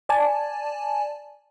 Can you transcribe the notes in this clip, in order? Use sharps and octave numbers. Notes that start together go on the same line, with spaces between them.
D5 G#5 A5